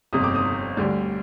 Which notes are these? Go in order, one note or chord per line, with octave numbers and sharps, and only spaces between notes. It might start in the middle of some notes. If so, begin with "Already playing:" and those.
G1 F2 C3 D#6
D6
D#6
D2 D3 G3